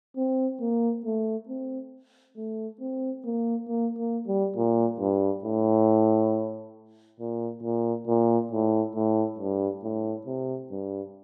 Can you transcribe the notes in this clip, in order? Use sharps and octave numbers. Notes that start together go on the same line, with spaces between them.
C4
A#3
A3
C4
A3
C4
A#3
A#3
A#3
G3
A#2
G2
A2
A#2
A#2
A#2
A2
A2
G2
A2
C3
G2